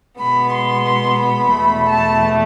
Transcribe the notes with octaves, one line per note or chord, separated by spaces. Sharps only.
B2 G#3 B3 B5
C6
B5
E2 B2 A3
A5